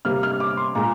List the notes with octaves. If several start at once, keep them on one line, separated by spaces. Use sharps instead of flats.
C3 G3 A#3 F6
F6
D6
C6
A#2 G#3 A#5